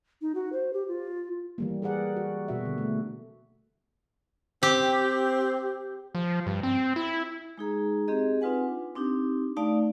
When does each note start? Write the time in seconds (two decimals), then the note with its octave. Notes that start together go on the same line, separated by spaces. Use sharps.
0.21 D#4
0.35 F#4
0.52 C5
0.73 G4
0.88 F4
1.58 E3 G3 A#3
1.82 G#4 A#4 D5 F#5
2.16 F#4
2.48 B2 F#4 E5
2.65 D3
2.78 A3
4.63 C4 G4
6.15 F3
6.46 G2
6.63 C4
6.96 E4
7.58 G#3 D#4 G#4 A#5
8.08 C4 G4 G#4 D#5
8.41 C4 D#4 F4 B4 F#5 G#5
8.68 D4
8.95 C4 D4 D#4 G4
9.57 A3 D#4 D5 F5 A5